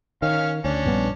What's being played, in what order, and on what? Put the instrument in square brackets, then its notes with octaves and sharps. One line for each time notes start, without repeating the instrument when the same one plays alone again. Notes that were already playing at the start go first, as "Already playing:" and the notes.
[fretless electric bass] D#3 [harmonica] C#4 F5 F6
[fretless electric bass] D2 [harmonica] C#4 D4
[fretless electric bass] A#1 G2 B3